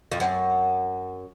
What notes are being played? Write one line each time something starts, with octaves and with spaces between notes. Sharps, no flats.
F2
F#2